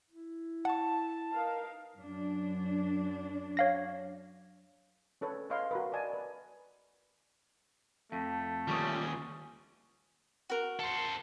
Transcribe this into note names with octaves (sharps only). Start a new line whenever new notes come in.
E4
F#5 A5 C#6
D#4 A#4 B4 F5
F#2 D4
C#5 F5 A#6
C#4 A4 B4 C#5
B4 C#5 D#5 F5 C6
F#4 A#4 B4
D5 D#5 G#5 A5
B4
F2 A3
D#2 G3 C#4 F4 C#6 D#6
F#4 A#4
A4 C5